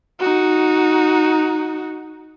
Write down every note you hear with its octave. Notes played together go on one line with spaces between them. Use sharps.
D#4 F#4